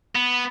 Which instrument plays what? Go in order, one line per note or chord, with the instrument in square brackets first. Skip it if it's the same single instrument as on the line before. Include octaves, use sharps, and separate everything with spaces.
[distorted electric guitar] B3